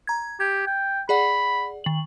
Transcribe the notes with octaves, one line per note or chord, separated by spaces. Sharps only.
A#5 G#6
G4 G#6
G5
G#4 D5 F#5 B5
D#3 F#7